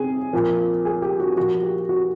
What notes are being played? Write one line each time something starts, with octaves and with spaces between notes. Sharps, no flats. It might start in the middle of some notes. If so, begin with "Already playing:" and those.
Already playing: C3 G#4
A#2 F3 A#4
G#4
G4
F#4
A#2 F3 F#4
G4
F#4